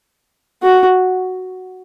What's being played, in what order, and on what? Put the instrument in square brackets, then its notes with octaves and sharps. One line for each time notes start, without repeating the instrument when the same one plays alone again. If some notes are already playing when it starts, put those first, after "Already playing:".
[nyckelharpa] F#4